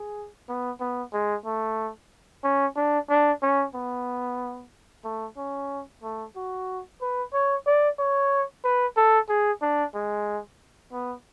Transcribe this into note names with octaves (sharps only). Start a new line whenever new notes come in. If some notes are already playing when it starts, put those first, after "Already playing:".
Already playing: G#4
B3
B3
G#3
A3
C#4
D4
D4
C#4
B3
A3
C#4
A3
F#4
B4
C#5
D5
C#5
B4
A4
G#4
D4
G#3
B3